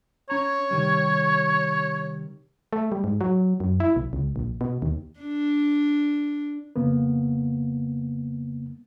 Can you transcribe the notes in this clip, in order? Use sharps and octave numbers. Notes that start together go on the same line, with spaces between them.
C#4 C#5 A#5
C3 D#3 G3
A3
G3
G#2
F#3
F#2
E4
B1
C#2
A#1
B2
D#2
D4
F2 C#3 A#3 B3